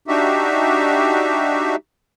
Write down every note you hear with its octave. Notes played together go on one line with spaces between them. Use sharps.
D4 D#4 F#4 G4 E5